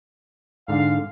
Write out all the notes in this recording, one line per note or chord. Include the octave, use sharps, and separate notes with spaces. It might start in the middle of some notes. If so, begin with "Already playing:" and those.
G#2 D3 F5